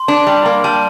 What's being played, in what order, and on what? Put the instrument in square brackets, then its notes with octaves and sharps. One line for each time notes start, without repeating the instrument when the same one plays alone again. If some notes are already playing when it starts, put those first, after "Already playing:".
Already playing: [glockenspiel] C6
[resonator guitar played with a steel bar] D4
G3
A#3
[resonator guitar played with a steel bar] G3 [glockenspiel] A5